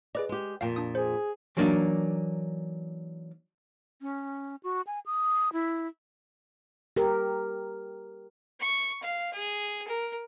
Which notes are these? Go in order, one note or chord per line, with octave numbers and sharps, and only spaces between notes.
G#4 B4 D5 D#5
G#3 G4
F2 A#2 F5 G5
D4 D#6
G#4 C5
E3 F#3 A#3 D4 D#4
C#4
F#4
G#5
D#6
E4
G4 A#4
C#6
F5
G#4
A#4